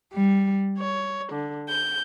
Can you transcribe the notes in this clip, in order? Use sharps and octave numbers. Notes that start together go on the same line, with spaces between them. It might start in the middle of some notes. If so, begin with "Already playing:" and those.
G3
C#5
D3
G6